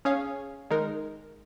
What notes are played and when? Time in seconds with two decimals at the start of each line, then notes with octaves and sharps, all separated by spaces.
0.05 C#4 G#4 C#5 F5
0.70 D#3 G#3 D#4 A#4